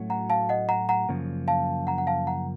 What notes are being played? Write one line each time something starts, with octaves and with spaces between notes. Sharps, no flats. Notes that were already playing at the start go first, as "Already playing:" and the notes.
Already playing: A2 F#3 A3 C#4 F#4
F#5 A#5
F5 A5
D#5 F#5
F#5 A#5
F#5 A#5
F#2 C#3 F3 A#3
F5 A5
F#5 A#5
F#5
F5 A5
F#5 A#5